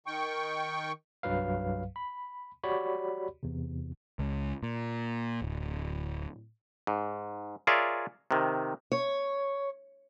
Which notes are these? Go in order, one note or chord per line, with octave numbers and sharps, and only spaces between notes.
D#3 G5 C#6
C2 G2 F#3 B4 F5
B5
F#4 G4 C#5 D5 B5
E2 C3
C#2
A#2
D1
G#2
F4 G#4 A#4 C#5 D5 E5
C3 D#3
C#5